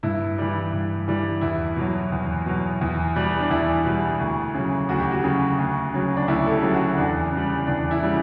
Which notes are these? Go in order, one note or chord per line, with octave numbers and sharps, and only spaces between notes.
G2 E4
E3 G3
G2
E3 G3
E2 E4
B2 F#3
E2
B2 F#3
E2
B2 G3
D4
E2 E4
B2 G3
D2
C#3 F#3
D2 F#4
G4
F#4
C#3 F#3
D2
C#3 F#3
D4
D2 E4
A4
G4
C#3 F#3
F#4
E2 D4
C#3
G3
E2 D4
E4
C#3 G3